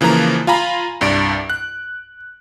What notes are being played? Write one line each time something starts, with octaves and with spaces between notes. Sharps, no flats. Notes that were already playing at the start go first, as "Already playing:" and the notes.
C#3 E3 F3 A#3 A#5
F4 F5 G#5 A#5 B5
C2 G2 D5 D7
F#6